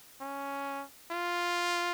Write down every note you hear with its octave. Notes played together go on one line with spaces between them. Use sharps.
C#4
F4